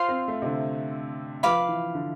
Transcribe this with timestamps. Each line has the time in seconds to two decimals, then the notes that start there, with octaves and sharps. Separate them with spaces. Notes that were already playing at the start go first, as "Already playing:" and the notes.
Already playing: F4 C5 F5 C6
0.09 C4
0.28 A3
0.42 C3
0.46 D3
1.43 F3 B4 F5 B5 D6
1.69 E3
1.95 D3